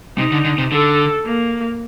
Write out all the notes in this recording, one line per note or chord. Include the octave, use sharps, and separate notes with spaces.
C3 D#4
D3
D3
C3
D3 A4
A#3